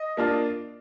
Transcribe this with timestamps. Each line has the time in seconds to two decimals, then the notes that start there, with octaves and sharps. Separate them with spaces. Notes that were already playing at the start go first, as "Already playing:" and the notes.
Already playing: D#5
0.17 A#3 D4 F4